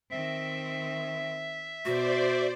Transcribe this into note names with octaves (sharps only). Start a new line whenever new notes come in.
D#3 C4 E5
B2 F#4 C5 D5